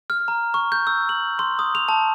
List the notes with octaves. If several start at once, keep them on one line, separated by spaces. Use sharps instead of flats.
F6
A#5
C#6
G6
E6
F#7
C6
D#6
F7
A5